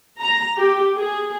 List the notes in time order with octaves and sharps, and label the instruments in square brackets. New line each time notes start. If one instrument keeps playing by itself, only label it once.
[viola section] A#5
G4
G#4